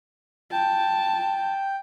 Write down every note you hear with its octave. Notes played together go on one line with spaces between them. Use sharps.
G5 A5